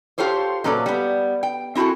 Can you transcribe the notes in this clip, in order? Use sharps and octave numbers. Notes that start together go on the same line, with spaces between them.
F4 G4 A4 C5 C#5
A#2 F#3 C#4 A4 B4 D5
G3 B3
G5
C4 E4 F#4 G#4 A4